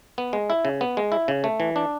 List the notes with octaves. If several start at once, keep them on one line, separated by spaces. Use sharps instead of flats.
B3
G#3
E4
C#3
B3
G#3
E4
C#3
A3
E3
D4